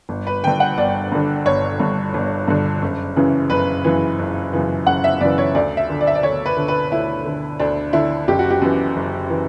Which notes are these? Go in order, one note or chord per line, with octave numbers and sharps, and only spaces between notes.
G1
B4
G2 D3 G5
F#5
G1 D5
G2 D3
G1 C#5
G2 D3
G1
G2 D3
F#1
F#2 C#3 E3
F#1 B4
F#2 C#3 E3
F#1
F#2 C#3 E3
F#1 F#5
E5
F#2 C#3 E3 D5
C#5
D2 D5
E5
D3
D5
E5
D5
D2 C#5
B4
D3
B4
D2 E4
D3
D2 D4
D3 E4
F#1 G4
F#4
G4
F#2 E3
F#1
E3